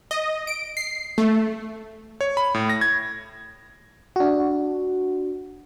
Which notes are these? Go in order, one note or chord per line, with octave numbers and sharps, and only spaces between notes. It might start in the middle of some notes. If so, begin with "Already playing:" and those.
D#5
D7
C7
A3
C#5
B5
A2
A#6
G#6
D4 F#4